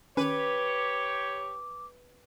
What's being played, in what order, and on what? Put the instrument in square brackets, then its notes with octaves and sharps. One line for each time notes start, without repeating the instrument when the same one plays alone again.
[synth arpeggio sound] D#3 C#4 [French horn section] G4 C#5 [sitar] B4 [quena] D6